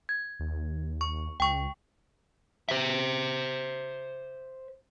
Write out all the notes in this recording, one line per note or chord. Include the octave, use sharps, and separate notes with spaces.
G#6
D#2
C#6
C#2 G5 C#6
C5 E5